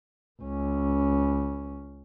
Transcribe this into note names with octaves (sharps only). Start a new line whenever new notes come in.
C#2 C#4